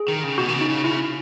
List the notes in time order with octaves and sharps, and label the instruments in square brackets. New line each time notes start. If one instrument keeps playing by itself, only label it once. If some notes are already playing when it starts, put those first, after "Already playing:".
Already playing: [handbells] G#4
[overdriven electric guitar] D#3
C#3
[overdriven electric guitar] B2 [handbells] F#4
[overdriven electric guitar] D#3
C#3
[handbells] D#4
[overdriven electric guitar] C#3
[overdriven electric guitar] C#3 [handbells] E4